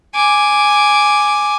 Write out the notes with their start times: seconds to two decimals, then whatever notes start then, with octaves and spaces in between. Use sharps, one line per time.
0.15 G#5 D6